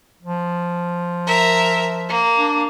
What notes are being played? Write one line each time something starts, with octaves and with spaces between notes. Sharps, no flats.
F3
A#4 E5
A#3
D4